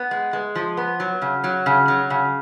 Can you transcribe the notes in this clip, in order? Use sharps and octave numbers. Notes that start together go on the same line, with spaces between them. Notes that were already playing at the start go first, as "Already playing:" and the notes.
Already playing: B3
G#3
G#3
F3
B3
F#3
C#3
F#3
C#3
F#3
C#3